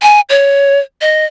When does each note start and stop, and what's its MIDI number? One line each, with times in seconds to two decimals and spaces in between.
0.02 0.20 80
0.29 0.79 73
1.01 1.25 75